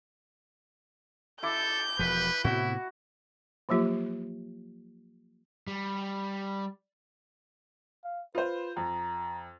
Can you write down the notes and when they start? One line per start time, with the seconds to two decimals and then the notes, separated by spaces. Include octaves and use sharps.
1.43 E4 A4 D6 G6
1.99 E1 F3 B4
2.44 A2 C3 B3 E4 F#4
3.69 F3 F#3 A#3 F4 G4
5.67 G3
8.04 F5
8.35 F4 B4 C5
8.77 F2 A#5